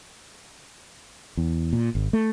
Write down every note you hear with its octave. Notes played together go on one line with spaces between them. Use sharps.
E2
A#2
G#1
A3